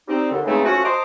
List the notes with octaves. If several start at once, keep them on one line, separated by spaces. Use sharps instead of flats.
G3 C4 D#4
D#2 D3
C#3 E3 G#3 A3 C4 D#4
F3 A3 C#4 F#4
C5 D#5 A5 A#5 C6 D6